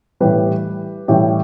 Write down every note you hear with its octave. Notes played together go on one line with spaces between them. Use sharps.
A2 E3 G3 G4 B4
A2 E3 G3 G4